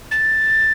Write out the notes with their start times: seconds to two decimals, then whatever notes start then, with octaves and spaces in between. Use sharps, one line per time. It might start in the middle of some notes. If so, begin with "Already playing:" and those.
0.11 A6